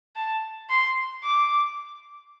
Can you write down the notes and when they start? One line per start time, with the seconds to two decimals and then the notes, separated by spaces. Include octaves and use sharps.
0.16 A5
0.69 C6
1.23 D6